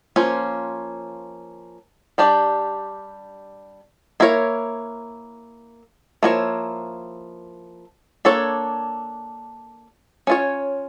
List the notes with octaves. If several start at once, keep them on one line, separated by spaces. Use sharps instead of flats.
F3 A#3 C#4 F4
G3 D4 G4 D5
A#3 E4 A#4 C#5
F3 A#3 E4 A#4 C#5
A#3 D4 A4 C#5
C#4 F4 C#5